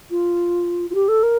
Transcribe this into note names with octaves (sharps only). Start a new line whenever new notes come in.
F4
F4
G4
A4
A#4